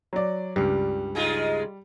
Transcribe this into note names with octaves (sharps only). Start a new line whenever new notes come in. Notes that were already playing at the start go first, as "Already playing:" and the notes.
F#3 D5
C#2 G2 G3
G#3 D#4 F4